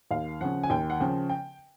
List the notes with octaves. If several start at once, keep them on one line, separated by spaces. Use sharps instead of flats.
D#2 F5
C#3 F3 F#5
G#5
D#2 G5
F#5
C#3 F3 G5
G5